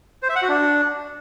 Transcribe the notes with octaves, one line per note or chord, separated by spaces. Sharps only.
C5
E5
F#5
F#4
D4